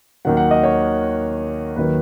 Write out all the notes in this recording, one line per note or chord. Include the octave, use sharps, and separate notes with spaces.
D#2 D#3 F#3 F#5
F#5
D#5
C#5
D#2 D#3 F#3 B4